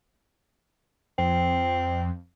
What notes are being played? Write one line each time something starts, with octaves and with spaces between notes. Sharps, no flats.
F2 C4